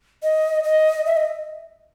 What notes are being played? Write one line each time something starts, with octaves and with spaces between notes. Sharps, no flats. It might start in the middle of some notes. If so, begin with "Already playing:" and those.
D#5
D#5
E5
D#5